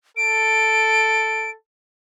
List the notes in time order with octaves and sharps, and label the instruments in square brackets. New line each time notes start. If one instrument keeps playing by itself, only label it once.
[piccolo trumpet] A4 [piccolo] D7